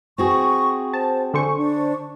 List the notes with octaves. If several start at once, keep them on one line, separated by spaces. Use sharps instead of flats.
C4 F#4 G#4 C#6
C5 A5
D3 C5 G#5 C#6
D4